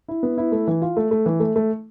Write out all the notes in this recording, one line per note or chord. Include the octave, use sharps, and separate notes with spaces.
E4
B3
E4
A3
E3
F4
A3
A3
E3
A3
A3